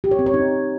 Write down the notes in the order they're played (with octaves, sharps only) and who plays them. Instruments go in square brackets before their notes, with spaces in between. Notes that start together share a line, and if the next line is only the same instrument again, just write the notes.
[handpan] G4
C#5
C4
C#5
D#4